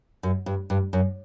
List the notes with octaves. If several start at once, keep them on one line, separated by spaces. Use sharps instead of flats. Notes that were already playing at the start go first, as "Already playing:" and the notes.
F#2
G2
G2
F#2